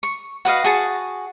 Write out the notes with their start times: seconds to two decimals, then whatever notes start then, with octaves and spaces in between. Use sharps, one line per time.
0.03 C#6
0.45 F#4 B4 D#5 F5
0.64 F#4 G#4 A5 C#6